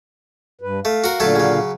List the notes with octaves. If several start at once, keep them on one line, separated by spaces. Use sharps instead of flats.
G2 B4
A3 F5
F#4 A#4
A#2 D3 F#3 A3 A4 F5
C#3 F#3